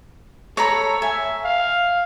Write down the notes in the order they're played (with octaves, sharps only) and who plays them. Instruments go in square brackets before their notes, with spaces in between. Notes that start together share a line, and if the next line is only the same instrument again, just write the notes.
[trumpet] A4 [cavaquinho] C#5 A#5 B5
[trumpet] E5 [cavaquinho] G#5
[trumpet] F5